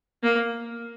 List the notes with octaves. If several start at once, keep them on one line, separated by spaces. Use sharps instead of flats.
A#3